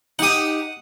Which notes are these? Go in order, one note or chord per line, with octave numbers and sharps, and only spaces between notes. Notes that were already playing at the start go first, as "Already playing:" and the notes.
D#4 G4 F#5 D#6